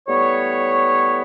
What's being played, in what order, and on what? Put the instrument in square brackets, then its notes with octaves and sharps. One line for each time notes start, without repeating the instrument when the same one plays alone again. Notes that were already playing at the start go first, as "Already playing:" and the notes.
[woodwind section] A2 G3 B3 C#5